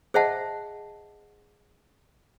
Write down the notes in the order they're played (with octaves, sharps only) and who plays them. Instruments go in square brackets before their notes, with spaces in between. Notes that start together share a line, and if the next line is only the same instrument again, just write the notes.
[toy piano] G#4 C5 D#5 E5 F#5 A5